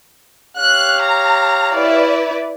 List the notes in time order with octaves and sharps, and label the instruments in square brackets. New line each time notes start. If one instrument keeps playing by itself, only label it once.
[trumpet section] G4 C#5 F5 [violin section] F#6
[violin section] A#5
E4 B4 D5